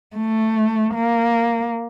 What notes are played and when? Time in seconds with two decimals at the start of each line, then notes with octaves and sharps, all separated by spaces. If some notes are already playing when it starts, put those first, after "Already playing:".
0.16 A3
0.95 A#3